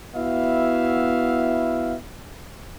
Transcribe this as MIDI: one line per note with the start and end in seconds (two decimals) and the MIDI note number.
0.15 1.95 59
0.15 1.95 64
0.15 1.95 66
0.15 1.95 76
0.15 1.95 77